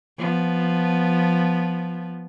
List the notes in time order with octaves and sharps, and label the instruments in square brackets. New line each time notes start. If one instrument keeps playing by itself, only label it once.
[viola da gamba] F3 B3